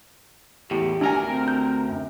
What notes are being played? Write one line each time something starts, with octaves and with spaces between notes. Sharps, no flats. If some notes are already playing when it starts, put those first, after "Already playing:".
E2 A2 G4
D2 D4 A#4 G#5
C4
G6
F#2